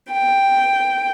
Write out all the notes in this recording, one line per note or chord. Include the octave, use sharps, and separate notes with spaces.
G5